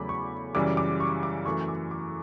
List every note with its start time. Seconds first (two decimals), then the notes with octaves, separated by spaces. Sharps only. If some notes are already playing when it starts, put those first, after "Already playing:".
Already playing: E2 C#3 F#3 A3 B5 D6
0.09 C#6
0.55 F#2 C#3 E3 G3 D6
0.77 D6
1.00 C#6
1.23 D6
1.46 F#2 E3 A3 C#6
1.68 D6
1.91 D6